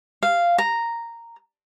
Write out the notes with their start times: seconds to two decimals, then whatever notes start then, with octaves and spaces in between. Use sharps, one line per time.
0.23 F5
0.58 A#5